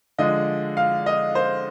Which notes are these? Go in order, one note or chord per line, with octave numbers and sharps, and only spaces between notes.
D3 F3 G#3 D#5
F5
D#5
C5